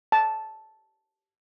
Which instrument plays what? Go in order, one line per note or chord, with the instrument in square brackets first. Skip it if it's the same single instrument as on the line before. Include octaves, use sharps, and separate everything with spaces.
[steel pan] A5